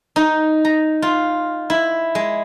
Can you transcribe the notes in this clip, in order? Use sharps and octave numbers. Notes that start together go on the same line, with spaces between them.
D#4
A#5
F4
E4
G#3